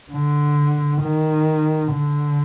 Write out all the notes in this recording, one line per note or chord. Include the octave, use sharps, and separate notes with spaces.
D3
D#3
D3